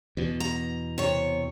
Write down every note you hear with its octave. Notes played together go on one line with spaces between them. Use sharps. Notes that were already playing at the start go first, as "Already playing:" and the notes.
E2 B2
A#5
C3 C#5